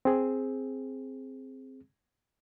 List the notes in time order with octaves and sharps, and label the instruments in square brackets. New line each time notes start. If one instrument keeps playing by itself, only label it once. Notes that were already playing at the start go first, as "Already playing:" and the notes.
[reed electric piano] C4 G#4